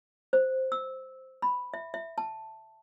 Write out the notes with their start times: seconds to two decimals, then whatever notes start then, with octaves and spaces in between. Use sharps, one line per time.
0.33 C5
0.72 E6
1.42 B5
1.74 E5
1.94 E5
2.18 A5